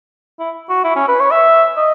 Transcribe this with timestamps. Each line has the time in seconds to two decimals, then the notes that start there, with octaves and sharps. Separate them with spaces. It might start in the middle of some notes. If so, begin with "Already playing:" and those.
0.39 E4
0.69 F#4
0.84 E4
0.96 C#4
1.08 B4
1.20 C#5
1.31 E5
1.77 D#5